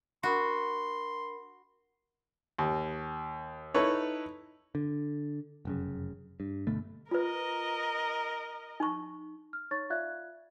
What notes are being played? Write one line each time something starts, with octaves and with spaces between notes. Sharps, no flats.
D4 F#4 A#4 B5 C6
D#2
D#4 E4 A4 B4 C#5
D3
F1 F#2 C#3
G2
G1 D2 B2 A3
F4 A#4 B4 D#5
D#4 C#6
F6
D#4 C#5 C#6 A6
F4 D5 E5 F5 F#6 G#6